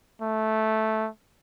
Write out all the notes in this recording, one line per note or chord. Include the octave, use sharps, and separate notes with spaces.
A3